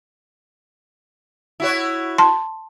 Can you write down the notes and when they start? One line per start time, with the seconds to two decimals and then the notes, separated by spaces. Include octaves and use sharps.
1.60 E4 F#4 C#5
2.18 A5 C6